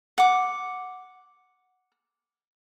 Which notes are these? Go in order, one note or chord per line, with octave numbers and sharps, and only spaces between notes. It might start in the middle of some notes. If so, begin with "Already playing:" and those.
F#5 D6